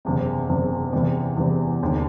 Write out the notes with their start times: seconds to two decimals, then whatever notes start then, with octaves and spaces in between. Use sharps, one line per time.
0.05 F#1 E2 C3
0.49 F#1 E2 C3
0.92 E2 C3 E3 G3
1.36 E2 C3 E3 G3
1.81 E1 D#2 D3